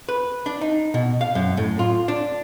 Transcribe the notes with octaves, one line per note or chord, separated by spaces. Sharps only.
B4
D4
D#4
B2
F5
F#2
A2
F4
D4